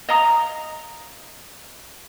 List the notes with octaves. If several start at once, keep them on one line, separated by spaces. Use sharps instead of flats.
D#5 F5 A#5 D#6